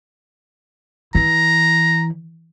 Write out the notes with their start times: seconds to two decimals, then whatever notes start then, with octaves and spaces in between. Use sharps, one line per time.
1.15 E3 A#5